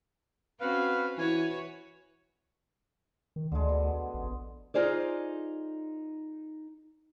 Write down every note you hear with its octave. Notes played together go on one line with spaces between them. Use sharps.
C4 C#4 F#4 B4 F5
E3 F#4 B4 C#5 G#5
D#3
D2 D3 G#3
B2
A1
D#4 F4 G#4 C5 D5